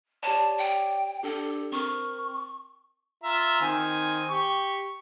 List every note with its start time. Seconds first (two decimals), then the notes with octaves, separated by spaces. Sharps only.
0.23 G4 C#5 D5 A5
0.58 G5
1.23 D4 G4 A4
1.72 C4 A#4 C#6
3.24 F4 E5 A#5
3.61 D#3 C4 G#5
4.30 G4 C#6